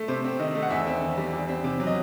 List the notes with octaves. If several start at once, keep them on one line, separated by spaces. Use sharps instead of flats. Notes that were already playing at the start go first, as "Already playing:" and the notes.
Already playing: A3
C3 C5
C4
D#3 D#5
A3
F#5
E2 E5
C4
D#3
G3
E2
C4
C3
F#3
D#5